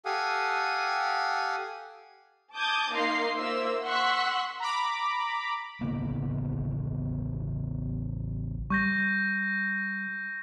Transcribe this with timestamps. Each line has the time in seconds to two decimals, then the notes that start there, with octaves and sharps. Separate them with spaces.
0.05 G4 A4 F5 F#5 G#5 D#6
2.56 A5 D6 D#6 G6 G#6
2.94 A#3 D#4 F5 C6 C7
3.38 A#3 F4 C5 E5 E6
3.83 F#5 C6 C#6 E6 F#6 B6
4.60 A#5 B5 D6
5.81 A1 C#3 A#3 B3
8.70 G3 C#6 G6 A#6